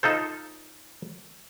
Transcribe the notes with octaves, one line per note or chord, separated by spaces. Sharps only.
D#4 F4 A4 C5